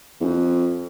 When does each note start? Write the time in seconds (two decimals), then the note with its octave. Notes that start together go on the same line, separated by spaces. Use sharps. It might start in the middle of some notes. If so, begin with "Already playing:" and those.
0.20 E2
0.25 F2